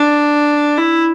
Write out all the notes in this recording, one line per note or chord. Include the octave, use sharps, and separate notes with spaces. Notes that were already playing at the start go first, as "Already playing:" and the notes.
Already playing: D4
E4